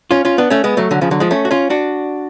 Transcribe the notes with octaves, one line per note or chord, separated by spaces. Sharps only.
C#4 F4
C#4 F4
B3 D4
A3 C#4
G#3 B3
F#3 A3
D3 F#3
C#3 F3
D3 F#3
F3 G#3
A3 C#4
F#4
C#4 F4
D4 F#4